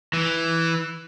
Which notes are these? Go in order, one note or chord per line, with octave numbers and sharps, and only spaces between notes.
E3